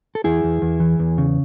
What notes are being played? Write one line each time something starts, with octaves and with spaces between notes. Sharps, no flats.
A4
E2 E4 G#4
E2
E2
E3
E2
C#3